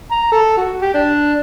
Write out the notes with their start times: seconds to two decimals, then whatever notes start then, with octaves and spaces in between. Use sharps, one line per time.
0.11 A#5
0.32 A4
0.57 F#4
0.82 G4
0.94 D4